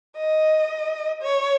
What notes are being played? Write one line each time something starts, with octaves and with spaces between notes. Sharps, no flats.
D#5
C#5